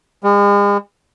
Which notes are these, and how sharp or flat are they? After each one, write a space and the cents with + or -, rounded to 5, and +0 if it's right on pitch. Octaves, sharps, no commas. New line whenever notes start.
G#3 -45